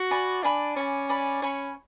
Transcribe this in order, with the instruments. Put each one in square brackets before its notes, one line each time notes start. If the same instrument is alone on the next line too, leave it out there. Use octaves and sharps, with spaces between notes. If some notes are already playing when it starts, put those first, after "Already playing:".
Already playing: [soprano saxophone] F#4
[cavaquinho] D5 G#5 B5
[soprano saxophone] D4 [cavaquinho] D5 G#5 B5
[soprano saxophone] C#4 [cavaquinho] D5 G#5 B5
[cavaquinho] D5 G#5 B5
[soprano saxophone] C#4 [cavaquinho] C#5 G#5 B5